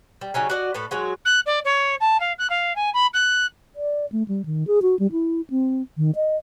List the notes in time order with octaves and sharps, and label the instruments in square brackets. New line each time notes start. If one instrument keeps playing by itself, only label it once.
[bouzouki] G3
C#3 F#3 C#4 D#4
F#4 D5 D#5
A2 A4 B4
F#3 G#3 F#4
[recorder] F#6
D5
C#5
A5
F5
F#6
F5
G#5
B5
F#6
[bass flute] D5
A3
G3
D#3
G#4
F#4
G3
E4
C4
D#3
D#5